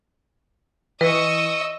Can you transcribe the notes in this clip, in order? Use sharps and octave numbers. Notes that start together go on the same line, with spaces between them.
E3 B4 D#5 C#6 D#6 E6